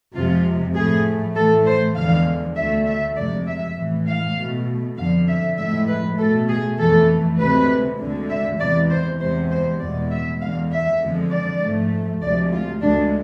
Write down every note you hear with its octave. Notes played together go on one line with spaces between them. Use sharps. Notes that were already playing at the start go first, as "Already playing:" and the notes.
F2 C3 F3 G#3 F4
A2 F3 A3 G#4
A2 E3 A3 A4
C5
E2 D3 F3 G#3 F5
D2 D3 A3 E5
E5
F2 C3 G#3 D5
E5
A2 E3 G#3
F5
B2 A3
F2 D3 F3 F5
E5
A2 F3 G#3 E5
B4
B2 A3 A4
G#4
F2 E3 A3 A4
D2 C3 G#3 B4
D2 D3 G#3
E5
E2 C3 E3 G#3 D5
C5
E2 C3 G#3 C5
C5
E2 B2 G#3 D5
E5
E2 D3 G#3 F5
E5
F2 D3 F3 G#3
D5
G#2 F3 A3
D2 C3 F3 G#3 D5
F4
D2 D3 G#3 D4